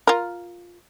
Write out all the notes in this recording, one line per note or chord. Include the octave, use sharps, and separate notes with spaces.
F4 A#4